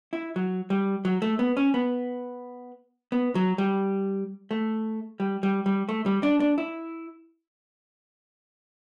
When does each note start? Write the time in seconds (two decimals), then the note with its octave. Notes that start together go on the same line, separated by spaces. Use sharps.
0.13 E4
0.36 F#3
0.70 G3
1.05 F#3
1.22 A3
1.39 B3
1.57 C#4
1.74 B3
3.12 B3
3.35 F#3
3.58 G3
4.51 A3
5.20 G3
5.43 G3
5.66 G3
5.89 A3
6.06 G3
6.23 D4
6.40 D4
6.58 E4